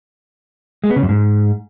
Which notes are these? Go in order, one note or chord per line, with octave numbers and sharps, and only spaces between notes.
G#3
B3
C#3
F#2
G#2